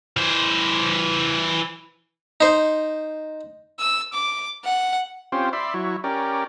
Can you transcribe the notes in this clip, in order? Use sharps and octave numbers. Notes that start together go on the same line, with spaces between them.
E3 C5
D#4 C5
E6
D6
F#5
C4 C#4 F4 G4 C5
D5 E5 B5 C6
F#3 E4 C#5
C#4 G4 A#4 D5